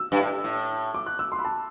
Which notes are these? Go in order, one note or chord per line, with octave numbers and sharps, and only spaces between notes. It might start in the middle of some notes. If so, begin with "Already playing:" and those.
Already playing: E6
G2
A2
A2
D6
F#6
E6
C6
B5
A5